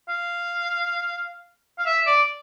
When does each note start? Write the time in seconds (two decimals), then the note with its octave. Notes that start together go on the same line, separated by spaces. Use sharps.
0.09 F5
1.79 F5
1.86 E5
2.07 D5